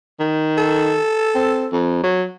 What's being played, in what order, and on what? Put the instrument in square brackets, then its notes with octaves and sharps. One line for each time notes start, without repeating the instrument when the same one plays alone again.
[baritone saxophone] D#3
[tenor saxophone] A4
[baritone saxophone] C4
F2
F#3